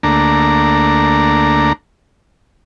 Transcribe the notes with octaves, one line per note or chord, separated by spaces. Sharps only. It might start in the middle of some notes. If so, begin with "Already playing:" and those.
D2 A3 A#3 D4 A#5